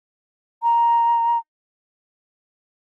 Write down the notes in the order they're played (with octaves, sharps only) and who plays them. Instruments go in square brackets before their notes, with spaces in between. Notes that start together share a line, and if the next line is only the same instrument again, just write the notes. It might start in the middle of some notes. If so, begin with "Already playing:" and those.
[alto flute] A#5